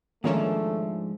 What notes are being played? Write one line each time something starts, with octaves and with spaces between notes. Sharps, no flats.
G#2 D#3 F3 A3 A#3 C#4 D4